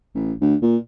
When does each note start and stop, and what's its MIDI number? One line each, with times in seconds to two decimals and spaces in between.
0.15 0.33 33
0.41 0.55 38
0.62 0.77 46